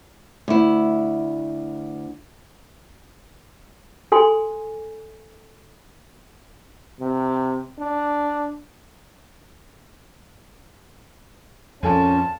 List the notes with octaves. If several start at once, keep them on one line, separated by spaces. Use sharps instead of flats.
D2 E4
A4 G#5 C6
C3
D4
F2 A#2 F3 C#4 A4 G#5 A5